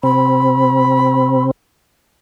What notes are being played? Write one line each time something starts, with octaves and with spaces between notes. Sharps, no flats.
C3 C4 B5